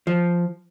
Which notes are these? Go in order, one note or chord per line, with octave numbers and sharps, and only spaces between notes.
F3